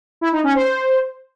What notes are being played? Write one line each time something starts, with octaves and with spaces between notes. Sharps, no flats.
E4
D#4
C#4
C5